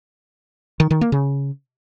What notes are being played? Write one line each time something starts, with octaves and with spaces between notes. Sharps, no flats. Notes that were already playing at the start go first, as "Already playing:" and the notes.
D#3
D#3
A#3
C#3